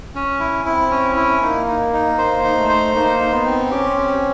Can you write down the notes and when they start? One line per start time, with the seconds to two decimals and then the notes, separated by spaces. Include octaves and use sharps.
0.15 C#4
0.40 E4
0.65 C4 E4
0.91 C#4
1.16 E4
1.42 A#3 D#4
1.67 D#4
1.93 D#4
2.18 A#3 C5
2.44 D#4
2.57 A3
2.69 C5
2.95 A#3 D#4
3.20 D#4
3.33 B3
3.45 C4
3.71 C#4 G4
3.97 C4